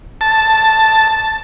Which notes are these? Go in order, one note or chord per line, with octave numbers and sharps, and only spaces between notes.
A5